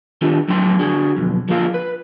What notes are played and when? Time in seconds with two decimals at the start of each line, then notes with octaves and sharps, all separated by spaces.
0.21 D#3 D4 F4 G4 A4
0.48 F2 A2 F#3 D#4 G5 C6
0.79 D3 F#4 G#4
1.16 B1 F2
1.49 F3 G#3 A#3 F4 A4 F5
1.74 B4